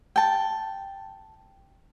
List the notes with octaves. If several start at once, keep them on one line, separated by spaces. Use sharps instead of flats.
G5 A5